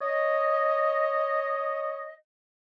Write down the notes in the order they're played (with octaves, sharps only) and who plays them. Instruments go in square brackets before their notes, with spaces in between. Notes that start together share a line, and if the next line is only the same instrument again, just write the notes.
[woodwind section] C#5 D#5